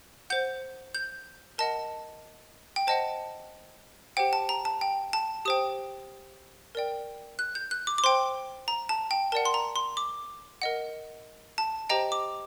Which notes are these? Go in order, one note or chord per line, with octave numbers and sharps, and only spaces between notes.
C5 F#5 G6
G6
A#4 D#5 F#5 A5
G5
C5 D#5 F#5 A5
G4 C5 F#5 G5
A5
A#5
A5
G5
A5
G4 C5 G5 D#6
A#4 D5 G5
F#6
G6
F#6
D6
D6
C5 G5 C6
A#5
A5
G5
A#4 D5 F#5 A5
C6
A#5
C6
D6
A#4 D#5 F#5
A5
G4 C5 D#5 G5 A#5
D6